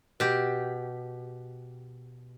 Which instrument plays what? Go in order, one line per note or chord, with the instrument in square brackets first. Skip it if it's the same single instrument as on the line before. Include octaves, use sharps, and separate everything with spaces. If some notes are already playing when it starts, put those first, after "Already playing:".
[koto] B2 G4